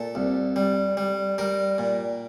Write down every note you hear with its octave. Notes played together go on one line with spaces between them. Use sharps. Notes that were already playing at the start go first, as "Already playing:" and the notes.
Already playing: A#2 A4
C2
G3
G3
G3 A#4
A#2